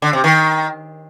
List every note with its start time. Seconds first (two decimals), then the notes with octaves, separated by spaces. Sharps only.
0.02 D3
0.13 C3
0.24 D#3